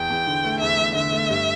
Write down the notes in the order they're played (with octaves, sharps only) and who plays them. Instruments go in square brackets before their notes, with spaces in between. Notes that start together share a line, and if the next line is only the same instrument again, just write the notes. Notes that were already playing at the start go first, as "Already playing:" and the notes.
Already playing: [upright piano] E2 [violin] G5
[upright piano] E2
D3
A3
[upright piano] E2 [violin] E5
[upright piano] E2
[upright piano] D3 [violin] E5
[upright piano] A3
G2